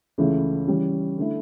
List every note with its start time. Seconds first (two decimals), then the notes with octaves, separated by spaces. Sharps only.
0.18 C#2 C#3 E3 A3 E4
0.67 C#3 E3 G3 C#4
1.17 D3 A3 E4